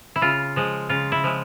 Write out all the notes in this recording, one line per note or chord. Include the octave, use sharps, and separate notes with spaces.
E4
C#3 F4
F3 G#3
C#3 F4
E4
F3 G#3